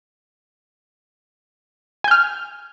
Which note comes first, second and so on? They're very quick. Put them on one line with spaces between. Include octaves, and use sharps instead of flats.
G#5 G6 F6